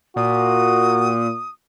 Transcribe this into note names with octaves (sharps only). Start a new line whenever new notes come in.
A#2 F#4 D#6